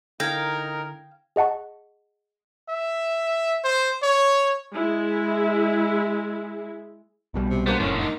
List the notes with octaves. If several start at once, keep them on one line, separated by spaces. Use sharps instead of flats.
D3 D#4 E4 A#4 F5 G5 G#6 A#6
G#4 D#5 F#5 A5 C#6
E5
C5
C#5
G#3 E4 G#4
B1 B2 G3
C3
G#3 A#3 B3 D4 C5
F1 F#2 A2 D3 D#3 C#4
D#4